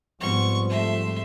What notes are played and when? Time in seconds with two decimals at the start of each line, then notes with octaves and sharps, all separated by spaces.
0.21 G#2 F3 G3 B3 C4 C#6
0.70 A3 E5 C6